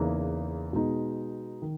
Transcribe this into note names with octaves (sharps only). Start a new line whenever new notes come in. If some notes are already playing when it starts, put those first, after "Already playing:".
Already playing: E2 C#3 E3 A#3 D#4
B2 G#3 B3 D#4
D#3